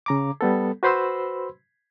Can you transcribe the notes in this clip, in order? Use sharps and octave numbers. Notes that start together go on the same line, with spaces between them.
C#3 A#5 D6
G3 B3 A4
F#4 B4 C5 B5 C6 E6